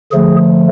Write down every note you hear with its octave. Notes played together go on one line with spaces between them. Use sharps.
D3 F3 A3 G#4